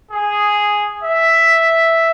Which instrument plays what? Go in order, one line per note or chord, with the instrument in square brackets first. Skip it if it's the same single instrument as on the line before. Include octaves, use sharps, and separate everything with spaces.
[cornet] G#4
E5